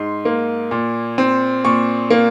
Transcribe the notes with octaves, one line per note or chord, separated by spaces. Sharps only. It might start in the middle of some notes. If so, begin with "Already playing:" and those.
Already playing: G#2 C6
A#3
A#2
C4
A#2 C#6
A#3